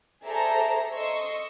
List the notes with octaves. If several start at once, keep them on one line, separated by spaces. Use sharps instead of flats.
G#4 A4 C5 D5 E5 A#5
D#5 C6 C#6 E6